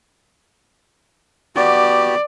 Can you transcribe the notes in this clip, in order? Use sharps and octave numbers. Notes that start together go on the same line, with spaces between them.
B3 F#4 G4 D5